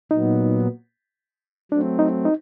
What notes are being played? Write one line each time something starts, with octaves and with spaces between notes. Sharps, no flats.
A#2 F#3 B3 D#4
F#3 A3 C4 D4
D#4
D#4